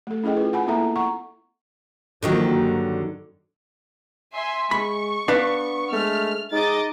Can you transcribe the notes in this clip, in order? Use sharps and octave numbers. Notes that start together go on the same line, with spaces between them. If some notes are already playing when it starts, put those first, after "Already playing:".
A3 A4
C#4 E4 G#4 D#5 G5
F4 B4
F#5 G#5 B5
A#3 B3 E4 A4 E5 A#5
F#5 A#5 C#6
D3 D#3 F3 F#3 A#3
G2
E5 G#5 C6
G#3 B5 C#6
B3 D4 B4 F5
G#3 A3 F6
G#3 D#4 D#5 D6 A6